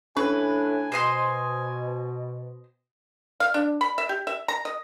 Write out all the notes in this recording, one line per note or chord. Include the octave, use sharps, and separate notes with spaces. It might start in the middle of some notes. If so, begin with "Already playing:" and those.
A2 C#4 D4 B4 G#5
B2 C5 D#5 C6
F5
D4
B5
E5
G4
E5
A#5
D#5